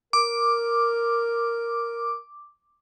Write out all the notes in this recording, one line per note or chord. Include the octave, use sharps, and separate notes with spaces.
A#4 D6